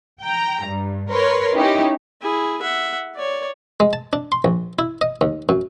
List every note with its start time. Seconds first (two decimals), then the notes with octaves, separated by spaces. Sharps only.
0.22 G5 A#5
0.65 G2
1.10 A#4 B4 C#5 C6
1.56 C#4 D#4 E4 G4
2.21 E4 G#4
2.62 E5 F#5
3.15 C#5 D5
3.80 G#3
3.93 A5
4.13 D4
4.32 C6
4.44 A#1
4.79 E4
5.01 D#5
5.21 D#2
5.49 F#2